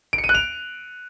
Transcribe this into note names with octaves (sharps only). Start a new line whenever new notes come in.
D7
C#7
D#7
F#6
F7